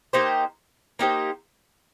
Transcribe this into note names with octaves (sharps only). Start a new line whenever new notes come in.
A#3 D#4 G4 C5
A#3 D#4 G4 C5